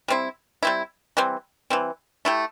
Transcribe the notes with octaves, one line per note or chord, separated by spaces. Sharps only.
G3 C4 E4
G3 C4 E4
E3 G3 C4
E3 G3 C4
A3 E4 G4